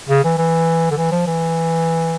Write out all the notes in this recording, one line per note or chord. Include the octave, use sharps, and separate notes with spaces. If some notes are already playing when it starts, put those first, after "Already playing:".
C#3
E3
E3
D3
E3
F3
E3